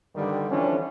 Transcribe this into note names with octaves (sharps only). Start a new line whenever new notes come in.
G2 D3 D#3 G3
D3 E3 F3 C#4 D4